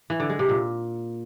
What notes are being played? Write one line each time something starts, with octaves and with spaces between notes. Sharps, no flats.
E3
D3
G#3
C3
A#2